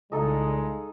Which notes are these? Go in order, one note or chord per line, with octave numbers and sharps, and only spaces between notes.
C2 A#2 C#3 G#3 D#4 A4 D#5